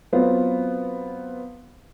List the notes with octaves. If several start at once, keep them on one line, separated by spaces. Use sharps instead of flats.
F#3 B3 C4 F4